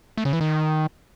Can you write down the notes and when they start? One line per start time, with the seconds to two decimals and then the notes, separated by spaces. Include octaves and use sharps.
0.17 A3
0.25 C#3
0.33 E3
0.41 D#3